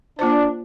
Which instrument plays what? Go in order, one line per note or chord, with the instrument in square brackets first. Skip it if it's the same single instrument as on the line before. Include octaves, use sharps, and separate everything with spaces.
[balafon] A#3 F4 C5 [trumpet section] D4